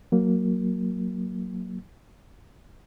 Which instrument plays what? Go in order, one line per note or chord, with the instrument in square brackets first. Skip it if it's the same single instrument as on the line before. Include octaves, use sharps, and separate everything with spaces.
[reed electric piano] F#3 A#3